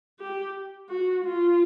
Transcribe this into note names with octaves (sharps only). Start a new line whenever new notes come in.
G4
F#4
F4